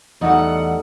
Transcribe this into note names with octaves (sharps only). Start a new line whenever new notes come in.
E2 G3 A3 D#4 F#5